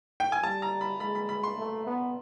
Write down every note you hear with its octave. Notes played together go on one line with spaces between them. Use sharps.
G5
G#5
G3 A5
A#5
B5
G#3 B5
B5
B5
C6
A3
B3